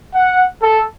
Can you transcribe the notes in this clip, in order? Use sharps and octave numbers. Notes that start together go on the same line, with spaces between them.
F#5
A4